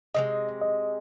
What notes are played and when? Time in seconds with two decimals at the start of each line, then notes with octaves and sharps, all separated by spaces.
0.14 C3 D#3 G#3 D#5
0.61 D#5